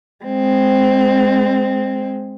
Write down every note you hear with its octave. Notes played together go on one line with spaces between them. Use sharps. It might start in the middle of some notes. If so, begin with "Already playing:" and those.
G#3 C4